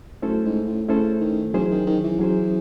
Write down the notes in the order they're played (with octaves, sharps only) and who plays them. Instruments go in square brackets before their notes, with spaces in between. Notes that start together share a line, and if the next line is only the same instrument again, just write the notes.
[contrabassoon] F#2 [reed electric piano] A3 C#4 E4 A4 C5
[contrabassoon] G#2
A2
[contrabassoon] C#3 [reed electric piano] A3 C#4 E4 A4 C5
[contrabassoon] D#3
[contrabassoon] E3 [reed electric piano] F#3 C#4 G#4 C5
[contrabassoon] D#3
D#3
E3
[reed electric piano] F#3 C#4 G#4 C5